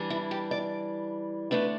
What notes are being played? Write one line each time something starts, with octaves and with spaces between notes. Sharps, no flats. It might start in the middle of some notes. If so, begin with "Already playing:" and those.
Already playing: E3 G3 D4
E4
G4
D5
D3 A3 D4 B4